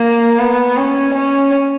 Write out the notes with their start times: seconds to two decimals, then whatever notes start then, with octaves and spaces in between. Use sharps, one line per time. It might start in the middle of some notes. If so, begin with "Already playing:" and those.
Already playing: A#3
0.39 B3
0.78 C#4
1.15 C#4